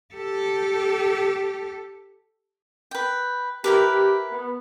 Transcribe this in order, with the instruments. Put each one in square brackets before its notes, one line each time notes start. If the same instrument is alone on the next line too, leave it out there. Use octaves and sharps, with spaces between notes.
[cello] G4 A4
[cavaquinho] B4 G5
[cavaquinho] E4 A#4 B4 [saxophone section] G4
[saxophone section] B3